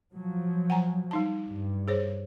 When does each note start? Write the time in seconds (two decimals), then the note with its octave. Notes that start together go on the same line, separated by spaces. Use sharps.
0.15 F3 F#3
0.70 F#5 G#5 A#5
1.11 G3 D#4 A5
1.49 G2
1.88 G#4 C5 C#5